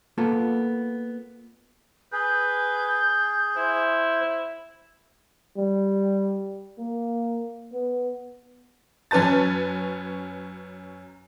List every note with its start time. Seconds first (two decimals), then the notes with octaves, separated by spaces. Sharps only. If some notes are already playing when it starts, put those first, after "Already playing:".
0.18 A#3 B3 F4 A4 A5
2.12 G#4 B4 G6
3.56 E4 C5
5.57 G3
6.78 A#3
7.73 B3
9.11 F#2 C#4 B4 A5 A6